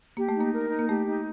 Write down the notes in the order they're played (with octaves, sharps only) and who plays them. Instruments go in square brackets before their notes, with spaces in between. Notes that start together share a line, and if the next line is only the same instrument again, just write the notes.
[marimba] A#3 [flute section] G4
[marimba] A3
[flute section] D#4
[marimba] A#3
[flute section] A#4
D#4
[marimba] A#3
[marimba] A3 [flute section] G4
[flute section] D#4